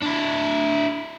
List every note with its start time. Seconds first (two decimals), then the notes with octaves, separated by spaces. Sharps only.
0.03 D4 E4